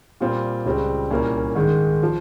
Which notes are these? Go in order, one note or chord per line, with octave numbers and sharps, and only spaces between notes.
A#2 G3 C4 F4
C#2 C#3 G3 C4
C2 A#2 G3 A#3 C#4
G#2 D#3 G#3
F3